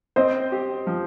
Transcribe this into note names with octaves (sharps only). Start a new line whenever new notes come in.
C4 C5 D#5
G4
F3